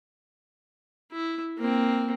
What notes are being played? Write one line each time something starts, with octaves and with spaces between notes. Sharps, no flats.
E4
A#3 C4